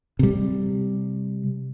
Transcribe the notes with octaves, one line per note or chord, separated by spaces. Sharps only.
C3 G3